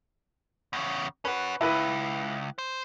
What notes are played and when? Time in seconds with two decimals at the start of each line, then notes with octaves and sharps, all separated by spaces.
0.73 E2 C#3
1.25 C#4 F#4 B4
1.61 C#2 E4 B4
2.58 C5